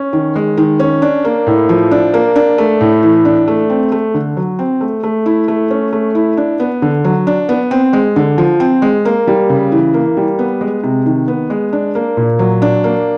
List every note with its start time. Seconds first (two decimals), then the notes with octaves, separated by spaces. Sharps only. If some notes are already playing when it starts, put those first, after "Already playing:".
Already playing: C#4
0.13 D#3
0.36 G#3
0.57 D#3
0.80 C#4
1.02 D4
1.25 A#3
1.47 A2
1.69 F3
1.91 D4
2.14 A#3
2.36 D4
2.58 A3
2.81 A2
3.03 E3
3.25 D4
3.48 A3
3.70 C4
3.92 A3
4.14 D3
4.37 F#3
4.59 C4
4.81 A3
5.03 A3
5.26 E4
5.48 A3
5.70 C#4
5.93 A3
6.15 E4
6.37 D4
6.60 B3
6.82 D3
7.04 F#3
7.27 D4
7.49 B3
7.71 C4
7.93 G#3
8.16 D3
8.38 F3
8.60 C4
8.82 G#3
9.05 A#3
9.27 G3
9.49 C#3
9.72 E3
9.94 A#3
10.17 G3
10.39 B3
10.61 G#3
10.83 C3
11.06 D#3
11.28 B3
11.50 G#3
11.73 D4
11.95 A#3
12.17 A#2
12.39 F#3
12.62 D4
12.84 A#3